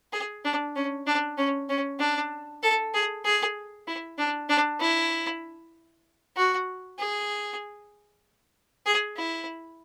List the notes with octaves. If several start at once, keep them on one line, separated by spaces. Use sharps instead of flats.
G#4
D4
C#4
D4
C#4
C#4
D4
A4
G#4
G#4
E4
D4
D4
E4
F#4
G#4
G#4
E4